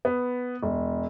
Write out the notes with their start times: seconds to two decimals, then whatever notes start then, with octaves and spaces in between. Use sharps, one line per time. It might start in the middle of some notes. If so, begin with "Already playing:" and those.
0.05 B3
0.63 E1